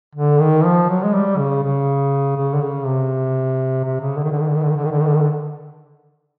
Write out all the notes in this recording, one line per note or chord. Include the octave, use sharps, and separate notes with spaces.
D3
D#3
F3
F#3
G#3
G3
C#3
C#3
C#3
D3
C#3
C3
C3
C#3
D3
D#3
D3
D#3
D3
D#3
D3
D#3
D3
D#3
D3
D#3
D3
D#3
D3